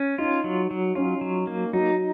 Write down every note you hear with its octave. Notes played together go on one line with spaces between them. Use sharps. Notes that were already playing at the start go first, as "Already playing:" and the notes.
Already playing: C#4
D#4 F4
F#3
F#3
C#4 F4
F#3
A#3
F#3 D#4